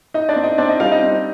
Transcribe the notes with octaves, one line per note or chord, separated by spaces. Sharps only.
D#4 D#5
D4 D5
C4
D#4 D#5
C4 D4 D5
D#4 D#5
G3 F4 F5
D#4 D#5
C4